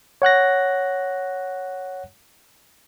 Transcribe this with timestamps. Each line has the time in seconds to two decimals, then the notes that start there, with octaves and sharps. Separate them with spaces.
0.22 C#5 F#5 F#6 A#6